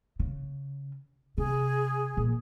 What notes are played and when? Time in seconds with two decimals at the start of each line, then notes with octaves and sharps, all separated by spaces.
0.20 C#3
1.38 C3 G#4
2.17 A#2 F3